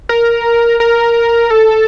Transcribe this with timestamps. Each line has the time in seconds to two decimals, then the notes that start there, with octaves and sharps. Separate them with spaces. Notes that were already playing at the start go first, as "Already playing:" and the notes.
0.09 A#4
0.80 A#4
1.50 A4